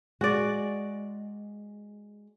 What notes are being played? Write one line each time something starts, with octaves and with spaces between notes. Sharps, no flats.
G#3 F#4 D5